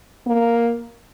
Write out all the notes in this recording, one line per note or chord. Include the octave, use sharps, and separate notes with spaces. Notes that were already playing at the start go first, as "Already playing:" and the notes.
A#3